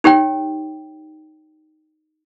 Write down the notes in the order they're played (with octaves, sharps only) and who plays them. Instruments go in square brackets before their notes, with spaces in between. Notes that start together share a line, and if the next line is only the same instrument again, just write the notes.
[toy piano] D#4 G4 C#5 G5